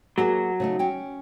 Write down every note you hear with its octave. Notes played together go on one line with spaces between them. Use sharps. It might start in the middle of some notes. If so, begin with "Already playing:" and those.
F#3 A#3 F#4 G#4
C#3 A3 D#4
C#4 G5